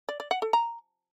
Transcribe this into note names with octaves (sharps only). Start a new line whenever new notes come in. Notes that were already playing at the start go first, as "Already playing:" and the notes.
D5
D5
F#5
A4
A#5